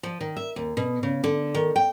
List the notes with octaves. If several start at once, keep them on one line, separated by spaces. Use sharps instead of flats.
F3
D#3
E5
D#2
B2
C#3
D3
D#3
G5